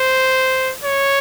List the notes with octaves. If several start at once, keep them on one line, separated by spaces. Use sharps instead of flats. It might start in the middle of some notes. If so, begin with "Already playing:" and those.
Already playing: C5
C#5